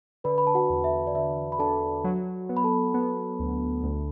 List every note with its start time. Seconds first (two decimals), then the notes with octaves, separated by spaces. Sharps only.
0.24 D3 B4 B5
0.38 B5
0.47 A5
0.55 F#4 F#5
0.70 E2
0.84 E5
1.07 D5
1.15 D3 E5
1.52 B5
1.59 D4 A4 A5
2.04 F#3
2.49 B3
2.57 B5
2.64 A4 A5
2.94 B3
3.39 D2
3.83 D2